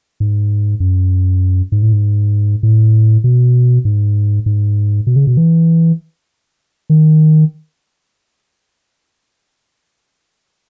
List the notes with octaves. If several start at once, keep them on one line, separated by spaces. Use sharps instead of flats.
G#2
F#2
G#2
A2
G#2
A2
B2
G#2
G#2
B2
C#3
B2
E3
D#3